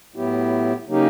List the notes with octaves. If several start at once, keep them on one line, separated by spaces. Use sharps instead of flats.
A2 F#3 B3 E4 G4
C#3 F#3 A#3 D#4 G4